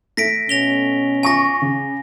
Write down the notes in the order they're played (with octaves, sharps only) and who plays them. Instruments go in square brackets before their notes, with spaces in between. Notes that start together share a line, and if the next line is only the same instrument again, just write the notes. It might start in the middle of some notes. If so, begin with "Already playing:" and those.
[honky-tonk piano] A3 [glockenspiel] A#6 B6 D7
[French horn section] B2 C#4 [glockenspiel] A#6 F7 G7
[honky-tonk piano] F4 C#6 D6 [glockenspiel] G#5 A#6
[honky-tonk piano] C#3